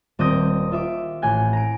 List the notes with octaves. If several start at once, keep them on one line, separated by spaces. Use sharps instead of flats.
D#1 C4 D6 D#6 G6 A#6
F4 E5 D6
A1 F#5 G#5 G6
A#5 D7